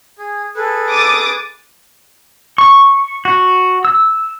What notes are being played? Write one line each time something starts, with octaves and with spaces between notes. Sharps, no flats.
G#4
G#4 A4 B4
D6 D#6 A6
C#6
F#4
E6